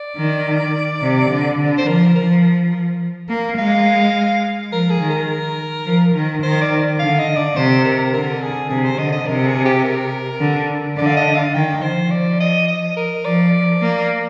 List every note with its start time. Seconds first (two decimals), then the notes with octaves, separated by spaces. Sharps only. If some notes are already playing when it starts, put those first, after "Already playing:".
Already playing: D5
0.17 D#3
1.02 C3
1.31 D3
1.59 D3
1.78 C5
1.87 F3 A#4
2.15 F3 A#4
3.29 A#3
3.58 G#3 F5
4.72 F3 A#4
4.90 G#4
5.01 D#3
5.10 A#4
5.85 F3
6.15 D#3
6.42 D#3 C5
6.61 D5
6.99 D3 F5
7.19 D#5
7.37 D5
7.56 C3 C5
7.85 A#4
8.13 D3 A#4
8.42 G#4
8.69 C3 G#4
8.84 C5
8.99 D3 D#5
9.12 D#5
9.27 C3 A#4
9.46 G#4
9.65 G4
9.84 A#4
10.40 D3
10.98 D3 D5
11.07 F5
11.17 D#5
11.35 F5
11.54 D#3 G5
11.82 F3 C5
12.11 D5
12.40 D#5
12.68 D#5
12.97 A#4
13.25 F3 D5
13.81 A#3